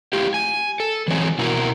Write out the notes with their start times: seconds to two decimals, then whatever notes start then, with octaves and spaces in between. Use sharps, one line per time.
0.13 A3 E4 F4 G4
0.34 G#5
0.80 A4
1.08 E3 F#3 G#3 C4 C#5 G#5
1.38 B2 E4 F#4 A#4